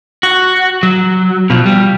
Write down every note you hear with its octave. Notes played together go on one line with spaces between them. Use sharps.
F#4
F#3
B2 F3
G3